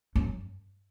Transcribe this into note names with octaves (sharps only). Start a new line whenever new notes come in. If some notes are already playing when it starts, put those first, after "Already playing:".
F#2